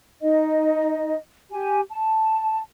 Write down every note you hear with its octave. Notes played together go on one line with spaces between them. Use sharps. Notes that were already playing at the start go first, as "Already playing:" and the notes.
D#4 D#5
G4 G#5
A5